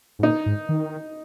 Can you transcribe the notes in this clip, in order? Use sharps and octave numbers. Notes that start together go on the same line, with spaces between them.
G#2
A#2 D#4
G#2
D#3